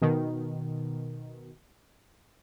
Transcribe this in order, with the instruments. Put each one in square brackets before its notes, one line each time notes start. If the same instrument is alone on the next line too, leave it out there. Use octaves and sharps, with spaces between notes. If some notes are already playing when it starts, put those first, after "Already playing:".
[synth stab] B2 D#3